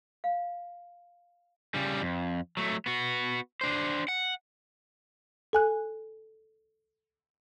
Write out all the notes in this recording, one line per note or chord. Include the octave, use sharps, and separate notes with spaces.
F5
C#3 G3
F2
F#3 A3
B3 F#4
D4 C5
F#5
A4 G#5 F#6